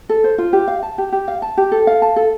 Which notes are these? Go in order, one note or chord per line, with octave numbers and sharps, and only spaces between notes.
A4
C5
F4
G4
F5
A5
G4
G4
F5
A5
G4
A4
F5
A5
A4